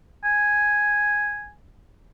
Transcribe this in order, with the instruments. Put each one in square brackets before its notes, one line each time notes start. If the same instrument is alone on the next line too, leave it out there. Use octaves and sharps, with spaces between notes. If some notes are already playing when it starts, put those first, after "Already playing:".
[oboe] G#5